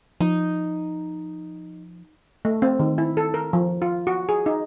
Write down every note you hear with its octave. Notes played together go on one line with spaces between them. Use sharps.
F3 D#4
A3
C4
D#3
E4
A4
A#4
F3
F4
F#4
G#4
D#4